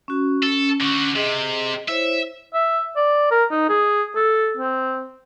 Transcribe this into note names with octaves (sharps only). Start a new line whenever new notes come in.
C#4 F#4
C#4 A4
D3 C#4 F#4 C#6
C3 G#4 D#5
E4 C5 C#5 E5
E5
D5
A#4
D#4
G#4
A4
C4